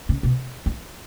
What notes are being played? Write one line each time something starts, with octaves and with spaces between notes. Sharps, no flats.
C#3
B2
E3